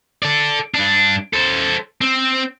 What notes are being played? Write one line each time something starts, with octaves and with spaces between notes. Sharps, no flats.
A4 D5
G2 D4
A4 C5
C4